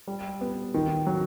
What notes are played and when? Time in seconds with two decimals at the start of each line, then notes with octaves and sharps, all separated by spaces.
0.08 G3
0.41 B3
0.74 D#3
1.07 F#3